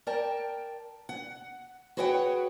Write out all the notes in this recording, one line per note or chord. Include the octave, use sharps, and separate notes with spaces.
A#4 D5 G5 A5
F#5
F#4 G#4 B4 C#5 F#5 G5